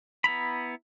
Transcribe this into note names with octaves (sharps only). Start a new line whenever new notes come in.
B3 E4 A#5 B5